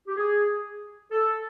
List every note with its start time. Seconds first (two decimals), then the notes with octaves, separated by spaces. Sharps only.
0.08 G4
0.17 G#4
1.11 A4